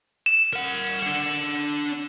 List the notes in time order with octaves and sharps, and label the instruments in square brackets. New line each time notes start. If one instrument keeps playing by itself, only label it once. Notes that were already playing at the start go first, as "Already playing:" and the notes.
[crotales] E7
[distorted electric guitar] A#4 F#5
D4 F#5